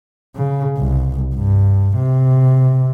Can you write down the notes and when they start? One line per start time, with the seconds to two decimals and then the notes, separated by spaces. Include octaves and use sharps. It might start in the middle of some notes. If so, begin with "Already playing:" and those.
0.35 C#3
0.78 C2
1.35 G2
1.97 C3